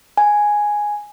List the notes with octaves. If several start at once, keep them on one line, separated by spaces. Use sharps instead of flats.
G#5